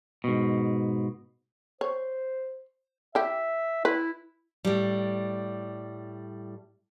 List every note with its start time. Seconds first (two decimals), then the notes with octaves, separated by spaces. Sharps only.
0.24 G#2 B2
1.81 C5 C#5
3.15 E4 G4 E5
3.85 E4 B4
4.65 A2 G3